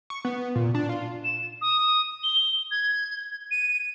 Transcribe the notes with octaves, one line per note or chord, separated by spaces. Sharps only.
C#6
B3
A#2
D4
F4
E7
D#6
G7
G#6
D#7